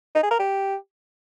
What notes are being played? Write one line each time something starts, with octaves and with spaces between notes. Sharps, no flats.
D#4
G#4
A#4
G4